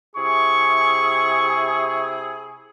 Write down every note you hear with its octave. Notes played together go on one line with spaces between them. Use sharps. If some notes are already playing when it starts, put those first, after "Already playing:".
C3 E4 G#4 C#6